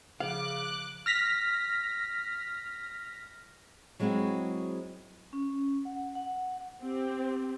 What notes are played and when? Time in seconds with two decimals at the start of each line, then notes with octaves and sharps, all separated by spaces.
0.20 C#3 F3 F5 D6 F#6
1.06 F6 A#6 B6
4.00 F#3 G#3 C4 E4 F#4
5.33 C#4
5.85 F#5
6.15 F#5
6.83 C4 G4